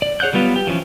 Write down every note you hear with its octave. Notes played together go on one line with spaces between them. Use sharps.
D5
G#4 C#5 F#5 F#6 G6
F#3 G3 B3 F4 B4
G4
E3 F3 C#4 F4